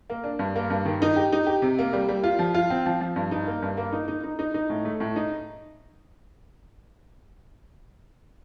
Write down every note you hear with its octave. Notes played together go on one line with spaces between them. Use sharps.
A#3
D4
G2
A#3
G2
D#3
D#4
G4
D#4
G4
C3
A#3
G3
G3
F4
F3
F4
C4
F3
F3
G2
D#4
A#3
G2
A#3
D#4
D#4
D#4
D#4
D#4
A2
A3
A2
D#4